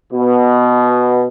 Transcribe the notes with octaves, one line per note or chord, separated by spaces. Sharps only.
B2